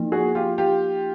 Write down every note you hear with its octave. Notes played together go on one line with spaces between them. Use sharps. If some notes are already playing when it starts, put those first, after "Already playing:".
Already playing: F3 A#3 D#4
F#4 G#4
F4 G4
F4 G4